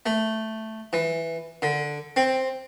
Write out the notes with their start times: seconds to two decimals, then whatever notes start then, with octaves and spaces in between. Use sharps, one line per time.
0.06 A3
0.93 E3
1.62 D3
2.16 C4